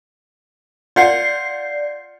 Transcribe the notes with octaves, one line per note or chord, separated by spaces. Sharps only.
F4 D5 F#5 G6 C7